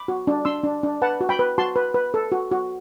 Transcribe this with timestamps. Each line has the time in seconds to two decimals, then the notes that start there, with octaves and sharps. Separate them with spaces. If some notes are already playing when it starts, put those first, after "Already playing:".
Already playing: B5 D6
0.08 F#4
0.27 D4
0.45 D4 C6 E6
0.64 D4
0.83 D4
1.02 B4 F#5 A5
1.21 F#4
1.29 G5 B5
1.39 B4
1.58 F#4 A5 C6
1.76 B4
1.94 B4
2.14 A4
2.32 F#4
2.52 F#4